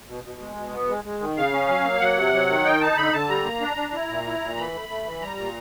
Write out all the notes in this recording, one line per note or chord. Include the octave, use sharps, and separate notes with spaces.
B2
B2
G#3
B2
B3
G#3
G#3
D#3
C#3 F5
C#4
F#3
A#3
F#3 F#5
C3
F#3
D#3
D#4 G5
D#4 A5
D3 B5
D3 A5
G3 A#5
A#3
D4
D4
E4
A#2
E4
A#2
E3 B5
A3
A3
E3
G3 A#5
A#2